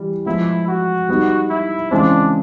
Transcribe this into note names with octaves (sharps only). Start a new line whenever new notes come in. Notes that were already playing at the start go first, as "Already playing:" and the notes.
Already playing: E3 G3
F3 G#3 B3 E4
F#4
G3 B3 D#4
E4
C#3 E3 G#3 C4 D4